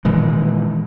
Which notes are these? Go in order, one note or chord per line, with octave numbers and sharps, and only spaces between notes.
A#2 D#3 E3 G#3